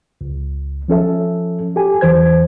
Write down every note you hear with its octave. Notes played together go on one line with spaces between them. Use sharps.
C#2
F3 C#4 A4 E5
G4 A4 G#5
E2 E3 C5 G#6